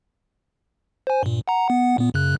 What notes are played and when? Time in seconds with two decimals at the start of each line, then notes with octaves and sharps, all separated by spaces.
1.07 C5 G#5
1.23 G2 A#2
1.48 F#5 A#5
1.69 B3 F#5
1.98 A#2 B3
2.14 F#2 C#3 F#6